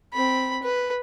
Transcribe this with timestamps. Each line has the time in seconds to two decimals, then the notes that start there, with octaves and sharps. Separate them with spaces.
0.13 C4 B5
0.62 B4